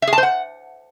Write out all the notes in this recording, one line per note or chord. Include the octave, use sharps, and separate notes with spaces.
E5
G#4
A5
C5
F#5